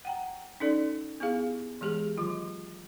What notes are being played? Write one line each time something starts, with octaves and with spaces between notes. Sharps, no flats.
F#5 G5 A#5
C#4 D#4 A4 D5
B3 E4 G4 G#4 F5
E3 G#3 G4 G#4
D#3 F#3 F4